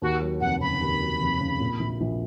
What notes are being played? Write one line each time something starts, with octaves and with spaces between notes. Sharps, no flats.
D#2 F#4
F#3
F1 F#5
C#3 B5
D#2
F#3
F1
C#3
A#2
A#1
A#1